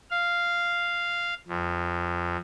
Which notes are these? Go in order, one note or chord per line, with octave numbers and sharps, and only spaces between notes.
F5
F2